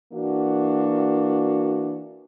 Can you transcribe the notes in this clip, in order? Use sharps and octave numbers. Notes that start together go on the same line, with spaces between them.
E3 A#3 D4 F#4